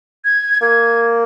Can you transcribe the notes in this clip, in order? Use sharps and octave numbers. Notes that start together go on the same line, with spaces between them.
G#6
A#3 G#6